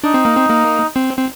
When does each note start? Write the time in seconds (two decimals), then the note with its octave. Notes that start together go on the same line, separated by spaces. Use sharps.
0.04 D4 D#4
0.14 C4
0.25 A#3
0.35 C4
0.50 A#3
0.96 C4
1.17 C4